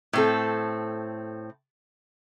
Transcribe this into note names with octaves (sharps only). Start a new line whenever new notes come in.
A2 C4 A4